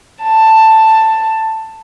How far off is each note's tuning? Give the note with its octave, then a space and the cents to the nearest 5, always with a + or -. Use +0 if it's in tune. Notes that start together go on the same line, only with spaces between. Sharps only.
A5 +10